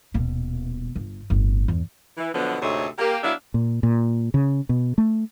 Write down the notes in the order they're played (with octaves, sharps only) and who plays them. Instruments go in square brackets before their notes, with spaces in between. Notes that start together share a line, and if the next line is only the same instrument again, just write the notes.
[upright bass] D#1 B2
G1
D1 G1
E2
[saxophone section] E3
B2 D3 F3 F#3 B3
D2 G#2 C3 A3 C#5 D#5
A#3 G4
F#3 B3 D4 E4 E5 F5
[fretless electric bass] A#2
A#2
C#3
B2
A3